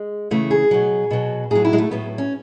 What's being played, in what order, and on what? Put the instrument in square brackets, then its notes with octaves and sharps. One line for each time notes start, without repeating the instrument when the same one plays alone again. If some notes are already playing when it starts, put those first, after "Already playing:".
Already playing: [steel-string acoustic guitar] G#3
C#3 E3 A3
G#4
B2 F#3
B2 F#3
A2 F#3 G#4
E4
G#3
A3
A2 F#3 B3
C#4